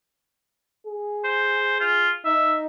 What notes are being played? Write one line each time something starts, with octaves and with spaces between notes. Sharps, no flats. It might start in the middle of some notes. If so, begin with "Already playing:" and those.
G#4
C5
F4
D#4 E5